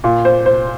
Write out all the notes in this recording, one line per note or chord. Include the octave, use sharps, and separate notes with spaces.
A#2
C5
C5